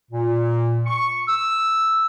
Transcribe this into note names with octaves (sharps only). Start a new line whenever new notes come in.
A#2
C#6
E6